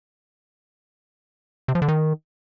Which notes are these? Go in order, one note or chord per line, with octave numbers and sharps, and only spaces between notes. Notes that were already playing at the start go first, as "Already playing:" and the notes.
C3
F3
D3
D#3